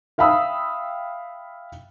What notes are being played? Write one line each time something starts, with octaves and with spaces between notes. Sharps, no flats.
E5 F5 G5 B5 D#6 E6